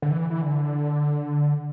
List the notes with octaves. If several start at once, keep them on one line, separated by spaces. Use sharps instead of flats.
D3
E3
E3
D3